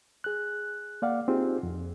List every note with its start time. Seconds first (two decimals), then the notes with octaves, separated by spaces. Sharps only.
0.24 G#4 F#6
1.02 A#3 D5 F5 F#5
1.28 C4 D#4 F4 G4 G#4
1.63 F2